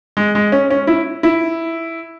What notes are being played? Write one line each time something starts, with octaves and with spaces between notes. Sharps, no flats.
G#3
G#3
C#4
C#4
E4
E4